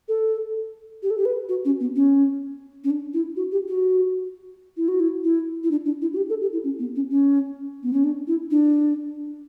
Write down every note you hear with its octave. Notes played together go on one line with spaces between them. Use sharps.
A4
G4
A4
G4
B4
F#4
C#4
B3
C#4
C#4
D4
E4
F#4
G4
F#4
E4
F#4
E4
E4
E4
D4
D4
E4
F#4
G4
A4
G4
E4
C#4
B3
C#4
C#4
B3
C#4
D4
E4
D4